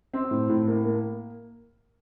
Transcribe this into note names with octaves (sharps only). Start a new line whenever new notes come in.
C4
A2
A2
A#3
A#3